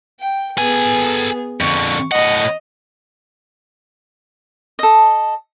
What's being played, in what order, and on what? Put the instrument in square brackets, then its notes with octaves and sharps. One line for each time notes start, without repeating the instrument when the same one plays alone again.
[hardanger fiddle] G5
[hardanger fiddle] B3 G#4 [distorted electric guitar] A4 G#5
[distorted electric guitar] F2 D3 [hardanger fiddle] C#6
[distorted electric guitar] A2 F#5 [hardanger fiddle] D#5
[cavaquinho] A4 D#5